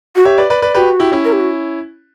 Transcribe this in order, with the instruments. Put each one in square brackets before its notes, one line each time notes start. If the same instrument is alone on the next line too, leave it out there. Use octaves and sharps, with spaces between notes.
[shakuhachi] F#4
[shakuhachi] G4 [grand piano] C#5 E5
[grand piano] B4 D5
B4 D5
B4 D5
[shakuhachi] F#4 [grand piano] G4 B4
[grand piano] E4 G4
C#4 E4
[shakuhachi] A#4
G4
F#4